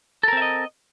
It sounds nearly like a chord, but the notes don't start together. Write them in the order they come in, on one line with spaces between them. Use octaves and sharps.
A4 A#4 C4 E5 D#5